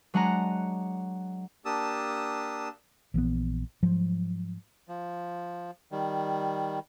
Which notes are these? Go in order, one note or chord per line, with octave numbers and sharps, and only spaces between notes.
F#3 G#3 D4 F#5 G#5 A#5
A#3 D4 G4 A5 D#6 E6
A#1 E3 F3 B3
G#2 F3 F#3 G#3
F3
D#3 G3